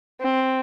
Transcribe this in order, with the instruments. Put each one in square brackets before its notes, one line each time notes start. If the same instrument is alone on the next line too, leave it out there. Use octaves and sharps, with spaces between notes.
[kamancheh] C4